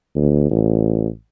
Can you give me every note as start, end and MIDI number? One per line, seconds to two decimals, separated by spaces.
0.15 0.46 38
0.51 1.07 33